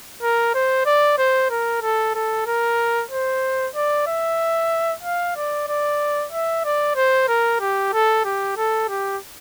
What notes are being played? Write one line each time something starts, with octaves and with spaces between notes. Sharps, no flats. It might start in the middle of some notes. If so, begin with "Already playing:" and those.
A#4
C5
D5
C5
A#4
A4
A4
A#4
C5
D5
E5
F5
D5
D5
E5
D5
C5
A#4
G4
A4
G4
A4
G4